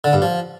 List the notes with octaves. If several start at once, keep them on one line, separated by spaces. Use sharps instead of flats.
D3
G2
F3